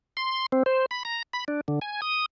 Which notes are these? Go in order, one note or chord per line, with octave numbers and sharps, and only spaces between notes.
C6
C4
C5
B5
A#5
B5
D4
D3
G#5
D#6